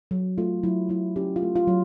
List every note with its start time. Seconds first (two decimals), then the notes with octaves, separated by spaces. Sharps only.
0.11 F#3
0.38 A3 F4
0.63 F#3 E4
0.89 F#3 E4
1.16 C#4 G4
1.36 F4
1.42 A3
1.56 F4
1.68 F#3